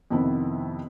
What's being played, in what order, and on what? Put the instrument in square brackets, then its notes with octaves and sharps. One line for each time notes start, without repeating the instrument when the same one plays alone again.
[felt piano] F2 C3 D#3 B3 E4